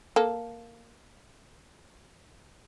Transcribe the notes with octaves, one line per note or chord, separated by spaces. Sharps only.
A#3 A4